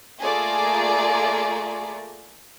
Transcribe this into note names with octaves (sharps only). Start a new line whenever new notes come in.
A3 A#3 F4 G#4 D5 A#5